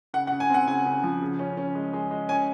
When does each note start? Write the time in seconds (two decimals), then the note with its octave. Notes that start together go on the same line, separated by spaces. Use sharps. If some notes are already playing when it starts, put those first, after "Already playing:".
0.14 C#3 F#5
0.27 F#5
0.32 C#3
0.40 G#5
0.50 C4 F#5
0.67 C#3 G#5
0.86 C#3
1.03 F3
1.21 C#3
1.39 C#4
1.57 C#4
1.75 G#3
1.93 G#3
2.11 G#3
2.29 C#4 G#5